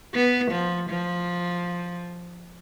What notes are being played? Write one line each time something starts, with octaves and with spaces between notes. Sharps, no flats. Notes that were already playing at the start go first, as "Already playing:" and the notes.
B3
F3
F3